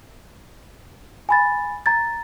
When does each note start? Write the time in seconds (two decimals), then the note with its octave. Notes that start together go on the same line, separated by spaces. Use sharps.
1.29 G#5 B5 A6
1.86 A#5 G#6 A6